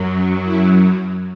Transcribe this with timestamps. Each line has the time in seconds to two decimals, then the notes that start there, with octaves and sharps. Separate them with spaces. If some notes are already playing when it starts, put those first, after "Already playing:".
Already playing: F#2 F#3
0.44 E4